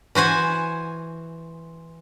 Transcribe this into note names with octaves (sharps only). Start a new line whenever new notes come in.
E3 F#4 C5 G#5